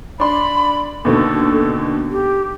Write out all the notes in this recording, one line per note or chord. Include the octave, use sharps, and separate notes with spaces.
D4 B5 C6
D#2 B2 D3 A4
G4